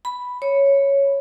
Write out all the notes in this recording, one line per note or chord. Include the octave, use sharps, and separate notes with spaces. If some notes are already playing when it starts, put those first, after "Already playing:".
B5
C#5